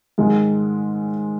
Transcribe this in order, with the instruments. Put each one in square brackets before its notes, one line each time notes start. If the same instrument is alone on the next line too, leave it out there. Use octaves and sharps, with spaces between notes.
[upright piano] G#2 D#3 G#3